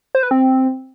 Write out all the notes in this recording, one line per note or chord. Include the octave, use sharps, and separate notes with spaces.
C5
B4
C4